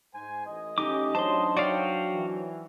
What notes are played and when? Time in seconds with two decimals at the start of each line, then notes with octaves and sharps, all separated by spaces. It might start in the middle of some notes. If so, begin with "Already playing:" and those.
0.14 G#2 C5 G#5
0.46 A1 D#5
0.78 C#4 D#4 G4 D6
1.15 F#3 D4 C5 A5 C6
1.57 F#4 D5 F5 G5
2.12 E3